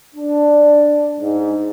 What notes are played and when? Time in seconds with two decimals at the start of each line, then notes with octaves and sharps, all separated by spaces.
0.15 D4
1.20 G#2